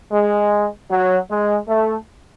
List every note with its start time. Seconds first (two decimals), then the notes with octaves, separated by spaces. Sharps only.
0.12 G#3
0.90 F#3
1.30 G#3
1.69 A3